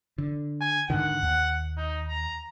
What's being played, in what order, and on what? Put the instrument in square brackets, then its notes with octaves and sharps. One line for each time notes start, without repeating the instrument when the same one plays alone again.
[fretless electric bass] D3
[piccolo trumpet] G#5
[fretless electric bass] G#2 D3 D#3 [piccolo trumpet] F#5
[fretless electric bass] D#2
[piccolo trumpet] D#4
A#5